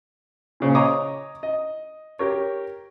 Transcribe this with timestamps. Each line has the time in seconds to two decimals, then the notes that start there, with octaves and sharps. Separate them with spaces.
0.60 A#2 C#3 C5
0.75 C#5 D#5 A#5 D6 D#6
1.43 D#5
2.19 G4 A#4 C#5